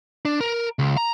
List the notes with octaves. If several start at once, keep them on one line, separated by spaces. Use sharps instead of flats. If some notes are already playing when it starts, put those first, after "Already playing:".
D4
A#4
C#2
A#5